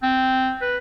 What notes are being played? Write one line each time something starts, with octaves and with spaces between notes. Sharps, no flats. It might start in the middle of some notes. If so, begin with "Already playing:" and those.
C4
B4